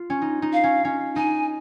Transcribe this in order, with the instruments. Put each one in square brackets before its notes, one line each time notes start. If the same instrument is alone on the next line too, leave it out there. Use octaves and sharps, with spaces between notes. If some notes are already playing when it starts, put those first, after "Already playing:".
Already playing: [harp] F4
C#4
D#4
D#4
[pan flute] F5
[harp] C#4
C#4
[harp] D#4 [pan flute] G#5